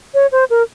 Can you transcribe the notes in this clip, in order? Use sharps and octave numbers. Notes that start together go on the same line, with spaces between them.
C#5
C5
A#4